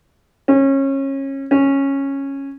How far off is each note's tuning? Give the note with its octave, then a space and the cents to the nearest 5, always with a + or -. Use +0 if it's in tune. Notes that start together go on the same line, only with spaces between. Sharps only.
C#4 -25
C#4 -10